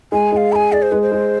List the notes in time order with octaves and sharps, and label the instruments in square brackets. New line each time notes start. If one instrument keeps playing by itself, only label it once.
[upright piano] G#3 [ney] G#5
[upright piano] G#3 [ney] G#5
[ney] F5
[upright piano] G#4 [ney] G#5 B5
[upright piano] G#4 [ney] D5
[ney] C5
[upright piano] G#3 [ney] B4
[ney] C5
[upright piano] G#3